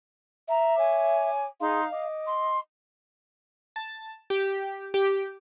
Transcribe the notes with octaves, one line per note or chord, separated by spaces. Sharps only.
E5 A#5
C#5 G#5 D6
D#4 G#4 F5 C6
D#5 D6
C6
A5
G4
G4